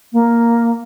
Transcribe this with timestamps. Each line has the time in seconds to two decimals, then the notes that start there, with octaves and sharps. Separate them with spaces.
0.13 A#3